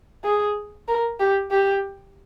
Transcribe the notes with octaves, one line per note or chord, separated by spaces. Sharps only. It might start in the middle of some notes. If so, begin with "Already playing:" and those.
G#4
A#4
G4
G4